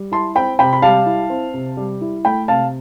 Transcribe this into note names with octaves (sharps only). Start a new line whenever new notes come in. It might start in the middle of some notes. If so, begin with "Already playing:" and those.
Already playing: G3
E4 A5 C6
C4 G5 B5
C3 G5 B5
B5
G3 F5 A5
E4
C4
C3
G3
E4
A3 G5 B5
C3 F5 A5